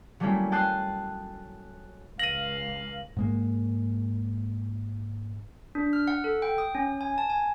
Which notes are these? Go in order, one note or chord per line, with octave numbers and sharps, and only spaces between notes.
F#3 G3 A3 A#3 C#4 E4
G5 A5 D#6 F#6 C7
C#2 F5 A#6 D#7 F#7
G#2 G#3 A#3
D4
F6
F#5
A4
G5
D#6
C#4
G#5
A5
G#5